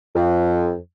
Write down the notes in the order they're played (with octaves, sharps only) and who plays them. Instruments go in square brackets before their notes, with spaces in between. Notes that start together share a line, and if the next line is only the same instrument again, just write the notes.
[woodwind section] F2